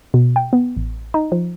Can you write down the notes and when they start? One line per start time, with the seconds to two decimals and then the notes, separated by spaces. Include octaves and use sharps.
0.14 B2
0.36 G5
0.53 B3
0.77 A1
1.14 D#4
1.32 F3